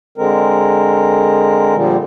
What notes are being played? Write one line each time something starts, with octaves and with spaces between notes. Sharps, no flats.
D3 G#3 C4 A#4
A#2 D3 F3 G3